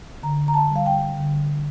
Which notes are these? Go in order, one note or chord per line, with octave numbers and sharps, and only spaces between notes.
D3 A#5
A#5
A5
G3
F5
G5
D3